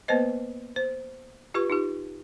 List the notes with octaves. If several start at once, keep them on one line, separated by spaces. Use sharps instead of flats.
A#3 B3 B4 C5 D#5
C5
F4 G4 B4 C#6
D#4 F4 G4